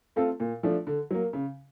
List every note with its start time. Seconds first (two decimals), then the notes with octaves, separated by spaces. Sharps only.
0.16 A3 C4 F4 A4
0.40 A#2
0.63 F3 A3 D4
0.87 D3
1.11 F#3 A#3
1.33 C#3